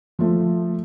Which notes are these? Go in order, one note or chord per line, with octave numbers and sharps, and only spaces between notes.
F3 A3